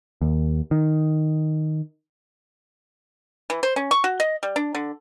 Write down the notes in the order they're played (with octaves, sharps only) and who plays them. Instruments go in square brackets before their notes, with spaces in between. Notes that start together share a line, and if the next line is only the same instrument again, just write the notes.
[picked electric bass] D#2
D#3
[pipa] E3
C5
C#4
C#6
F#4
D#5
G3
D4
D3